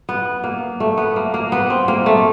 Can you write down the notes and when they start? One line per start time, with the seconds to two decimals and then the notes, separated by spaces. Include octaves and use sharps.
0.09 B3
0.44 A#3
0.80 A3
0.98 B3
1.16 A#3
1.34 A#3
1.52 B3
1.70 C4
1.88 A#3
2.06 A3